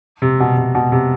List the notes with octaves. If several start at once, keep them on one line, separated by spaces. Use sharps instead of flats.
C3
B2
C3
B2
C3